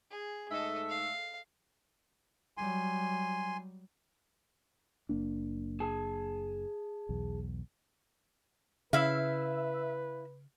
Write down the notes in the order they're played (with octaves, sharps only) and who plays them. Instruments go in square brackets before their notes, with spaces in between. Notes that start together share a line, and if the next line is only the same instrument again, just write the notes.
[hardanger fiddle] G#4
[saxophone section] G#2 A3 E5 [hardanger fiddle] A4 D#5
[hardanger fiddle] F5
[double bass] F#3 G3 [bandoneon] G#5 C6
[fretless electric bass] F#1 A#3 D4
[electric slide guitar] G#4 G#5 A5
[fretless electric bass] B1 E2
[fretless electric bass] C#3 [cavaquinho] E4 F5 [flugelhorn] B4 [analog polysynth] E5